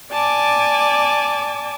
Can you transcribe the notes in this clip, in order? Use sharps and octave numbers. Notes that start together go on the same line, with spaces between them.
D5 G#5 A5 D6